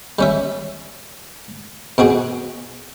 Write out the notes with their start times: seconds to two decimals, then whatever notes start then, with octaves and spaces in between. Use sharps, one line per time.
0.19 G3 C#4 E5
1.98 B2 C4 F#4 G#4